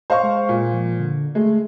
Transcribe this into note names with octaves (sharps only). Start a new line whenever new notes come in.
C5 D#5 F5 C#6
G#3
A#2
F3
D3
G#3 A3